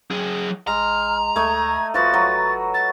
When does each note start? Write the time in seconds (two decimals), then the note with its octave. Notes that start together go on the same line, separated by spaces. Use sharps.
0.11 F#3 G#4
0.67 A1 G#3 A#5 F6
1.36 D2 A3 D#5 G#6
1.94 F#1 F3 F#4 B4 A6
2.14 F#3
2.74 A6